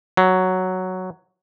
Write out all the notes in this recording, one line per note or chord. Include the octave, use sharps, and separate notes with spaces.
F#3